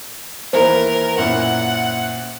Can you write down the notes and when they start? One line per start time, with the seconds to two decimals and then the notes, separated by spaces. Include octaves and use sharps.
0.53 D#2 E3 A#4 C5
1.18 F#2 A#2 E4 F#5